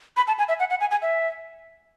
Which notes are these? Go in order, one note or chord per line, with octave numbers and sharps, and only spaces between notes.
B5
A5
G#5
E5
F#5
F#5
G#5
G#5
E5